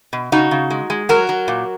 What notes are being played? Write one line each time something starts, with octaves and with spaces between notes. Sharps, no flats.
B2
C#3 D#4 F#4
C#3
G#3
G#3
F#3 F#4 A#4
F#3
A#2